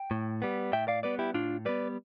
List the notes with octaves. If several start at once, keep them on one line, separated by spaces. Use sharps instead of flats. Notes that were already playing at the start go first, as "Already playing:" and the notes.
Already playing: G5
A2
G3 B3
A2 E5 G5
D5 F5
G3 B3 B4 D5
E4 G4
A2 D4 F4
G3 B3 B4 D5